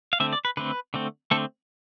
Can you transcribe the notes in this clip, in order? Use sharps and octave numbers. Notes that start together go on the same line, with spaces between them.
F5
D3 A3 C4 E5
D5
B4
D3 A3 C4 B4
D3 A3 C4
D3 A3 C4 A4